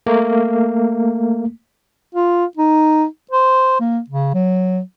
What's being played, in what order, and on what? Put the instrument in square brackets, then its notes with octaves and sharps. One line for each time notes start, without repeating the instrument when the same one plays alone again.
[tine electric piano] A3 A#3
[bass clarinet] F4
D#4
C5
A#3
C#3
F#3